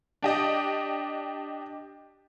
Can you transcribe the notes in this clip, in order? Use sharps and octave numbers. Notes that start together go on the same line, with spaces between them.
D4 G4 D#5